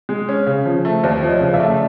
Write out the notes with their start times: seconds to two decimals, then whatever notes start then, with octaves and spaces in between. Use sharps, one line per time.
0.09 G#3
0.29 C#4
0.46 C#3
0.66 F3
0.85 A3
1.03 D#2 C5 D5
1.22 F3
1.28 C#5 D#5
1.40 C#3
1.53 D5 E5
1.60 A3